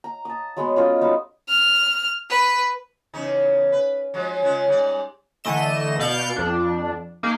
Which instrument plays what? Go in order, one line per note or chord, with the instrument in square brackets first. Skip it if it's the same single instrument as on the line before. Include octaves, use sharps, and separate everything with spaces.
[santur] A#5
A5 D#6
F#3 G#3 B3 G#4
C#4 F4 A4 D#5
G3 B3 D#4 F#4
[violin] F6
B4
[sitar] E2 C#3 D#4
B4
F3 F#3 G#3
C#3 G#3 F4
G#2 G3 D5
[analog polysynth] D3 E3 A3 D#5 E7
B2 D5 F5 G6 C#7
F2 D4
A#3 D#4 G#4